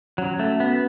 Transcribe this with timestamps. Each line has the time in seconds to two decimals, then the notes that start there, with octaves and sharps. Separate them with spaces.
0.18 F#3 C#4
0.39 A3 F#4
0.60 B3 B4